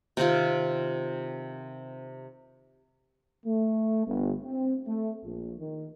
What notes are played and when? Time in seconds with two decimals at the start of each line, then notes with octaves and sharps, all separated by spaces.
0.17 C3 D#3 C4 F4
3.46 A3
4.07 G1
4.44 C4
4.87 A3
5.24 A#1
5.59 D#3